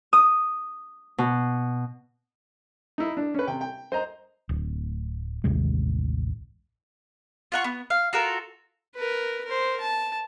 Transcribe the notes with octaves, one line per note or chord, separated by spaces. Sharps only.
D#6
B2
D#4 E4
D4
C#4 B4
C3 G5
G5
C5 D#5 A#5
D1
A1 D#2 C3 G#3
F4 F#5 C#6
B3
F5
F4 F#4 A4 A#4
A#4 B4
A#4 C5
A5